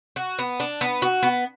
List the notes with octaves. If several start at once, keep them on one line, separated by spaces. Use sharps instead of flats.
F#4
B3
D4
B3
F#4
B3